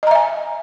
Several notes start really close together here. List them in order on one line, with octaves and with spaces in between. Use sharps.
D#5 A#5 E5 G#5